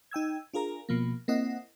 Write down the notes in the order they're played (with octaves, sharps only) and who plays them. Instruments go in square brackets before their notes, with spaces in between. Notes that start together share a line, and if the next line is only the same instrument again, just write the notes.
[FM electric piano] D#4 G5 E6 G#6
D4 F4 G#4 A#4 A#5
B2 F3 A#3
A#3 C4 E4 D#5 F#5